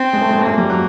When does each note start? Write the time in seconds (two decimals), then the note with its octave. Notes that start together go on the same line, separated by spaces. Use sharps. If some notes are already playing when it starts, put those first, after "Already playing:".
Already playing: C4
0.13 G#3
0.21 A3
0.31 G#3
0.38 A3
0.46 G#3 A#3
0.58 G3
0.70 F#3